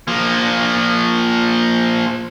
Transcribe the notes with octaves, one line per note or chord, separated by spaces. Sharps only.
F3 A#3